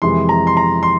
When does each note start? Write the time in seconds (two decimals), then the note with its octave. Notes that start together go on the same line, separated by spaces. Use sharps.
0.02 F2 C3 E3 G#3 C6
0.29 A#5
0.47 C6
0.57 A#5
0.83 C6